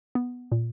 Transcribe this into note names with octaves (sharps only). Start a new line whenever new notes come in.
B3
A#2